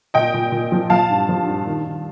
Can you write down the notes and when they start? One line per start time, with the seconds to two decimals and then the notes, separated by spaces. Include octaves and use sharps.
0.14 A#2 D#5 G5
0.34 A#2
0.52 A#2
0.72 F3
0.90 F3 F5 A5
1.10 G2
1.29 F3
1.47 G2
1.67 D#3
1.85 D#3